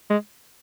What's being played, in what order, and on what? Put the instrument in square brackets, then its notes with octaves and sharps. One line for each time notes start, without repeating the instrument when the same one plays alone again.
[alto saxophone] G#3